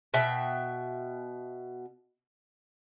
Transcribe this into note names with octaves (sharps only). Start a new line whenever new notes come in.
B2 E5 G5